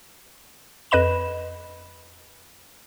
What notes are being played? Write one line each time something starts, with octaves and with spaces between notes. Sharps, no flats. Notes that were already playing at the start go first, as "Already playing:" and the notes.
F2 B4 D#5 B5 E7